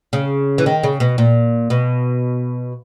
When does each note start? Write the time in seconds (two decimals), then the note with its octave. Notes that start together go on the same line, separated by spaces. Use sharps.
0.13 C#3
0.58 E3
0.66 D#3
0.83 C#3
1.00 B2
1.18 A#2
1.70 B2